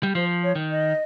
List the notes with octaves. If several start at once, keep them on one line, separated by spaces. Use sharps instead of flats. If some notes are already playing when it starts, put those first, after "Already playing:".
G3
F3 C5
C#5
D#3
D#5